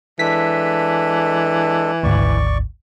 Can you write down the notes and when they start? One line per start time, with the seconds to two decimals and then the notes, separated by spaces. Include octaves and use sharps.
0.19 E3 G#3 D4 A4 B6
2.03 G#1 D2 D5 C#6